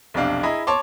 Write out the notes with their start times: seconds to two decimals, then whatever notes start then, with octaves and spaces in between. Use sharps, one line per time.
0.14 B1 F2 C3 D4 F5
0.43 E4 G#4 D#5 A#5 B5
0.67 C#5 A5 C6 D6